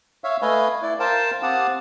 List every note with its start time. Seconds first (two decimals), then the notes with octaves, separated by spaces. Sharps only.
0.24 C#5 E5 F5
0.42 A3 B4 D#5 F5 G#5
0.82 E4 D5
0.99 A#4 C5 F5 G5 A5
1.43 C4 G4 F5 F#5 A5 D#6